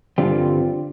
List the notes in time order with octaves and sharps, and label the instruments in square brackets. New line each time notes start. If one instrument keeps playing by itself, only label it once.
[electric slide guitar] G2 D3 G3 C4 F4